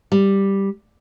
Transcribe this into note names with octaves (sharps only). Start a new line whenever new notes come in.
G3